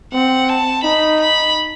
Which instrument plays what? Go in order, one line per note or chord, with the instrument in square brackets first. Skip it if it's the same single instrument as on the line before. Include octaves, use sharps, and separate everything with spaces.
[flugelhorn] C4 [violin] F#5
[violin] A5
[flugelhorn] D#4 [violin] B5
[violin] B5